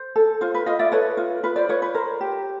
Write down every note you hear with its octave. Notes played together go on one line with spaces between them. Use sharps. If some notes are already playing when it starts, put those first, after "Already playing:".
Already playing: C5
A4
F4 C5
B4
F4 D#5 F5
D5 E5
A4 B4 C#5
F4
F4 B4
C5 D5
F4 B4 C#5
B4
A#4 C5
G4